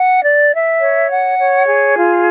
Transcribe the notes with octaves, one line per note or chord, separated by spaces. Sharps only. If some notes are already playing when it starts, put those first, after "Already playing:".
Already playing: F#5
D5
E5
C#5
F#5
C#5
G#4
F4